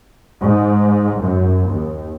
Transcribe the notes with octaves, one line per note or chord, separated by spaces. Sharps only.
G#2
F#2
D#2